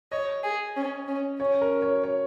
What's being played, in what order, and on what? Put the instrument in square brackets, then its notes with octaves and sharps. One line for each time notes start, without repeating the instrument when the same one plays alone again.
[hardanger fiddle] C#5 [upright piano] D#5
[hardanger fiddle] G#4
C#4
C#4
[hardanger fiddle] C#4 [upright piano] C#5
[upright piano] A#4
C#5
C#5